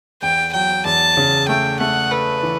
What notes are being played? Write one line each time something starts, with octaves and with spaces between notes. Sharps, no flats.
E2 G5
F#3 G5
E2 A5
C#3
A3 G5
A3 F#5
A4 B4
E3